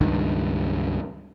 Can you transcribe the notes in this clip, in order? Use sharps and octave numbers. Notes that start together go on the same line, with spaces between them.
C#2 G2 D#3